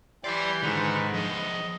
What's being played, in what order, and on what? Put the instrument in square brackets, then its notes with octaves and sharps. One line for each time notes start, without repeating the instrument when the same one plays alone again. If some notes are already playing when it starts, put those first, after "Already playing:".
[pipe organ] E3 G4 C6 [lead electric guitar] D5 B5
[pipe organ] G#2 D#3 B4 [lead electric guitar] D3
[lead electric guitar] F3 G#4 [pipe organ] D#5